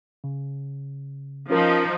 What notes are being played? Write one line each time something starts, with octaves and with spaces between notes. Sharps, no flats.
C#3
F3 C#4 D#4 F4 A#4